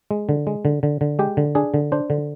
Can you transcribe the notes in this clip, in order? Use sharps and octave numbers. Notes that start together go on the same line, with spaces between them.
G#3
D3
G#3
D3
D3
D3
G#3 G4
D3
D4 G#4
D3
D4 C5
D3